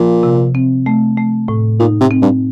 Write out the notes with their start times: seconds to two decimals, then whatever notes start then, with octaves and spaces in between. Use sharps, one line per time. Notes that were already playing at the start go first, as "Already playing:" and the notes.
Already playing: A#2 F3
0.23 C3
0.55 C4
0.86 A3
1.17 A3
1.48 A2
1.79 A#2 D#4
2.01 C3
2.11 C4
2.22 G2